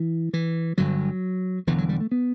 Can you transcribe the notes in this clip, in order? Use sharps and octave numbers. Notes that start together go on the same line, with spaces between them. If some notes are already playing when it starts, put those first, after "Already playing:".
Already playing: E3
E3
G1 G2 D3 F#3
E1 E2 D3 E3
F#3
G3
A3
B3